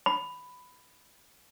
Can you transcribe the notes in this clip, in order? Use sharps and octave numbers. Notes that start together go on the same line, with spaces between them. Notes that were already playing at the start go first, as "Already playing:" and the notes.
B5